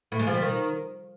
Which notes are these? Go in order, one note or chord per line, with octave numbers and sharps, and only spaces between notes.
A2
G#3
F3
G3
D#3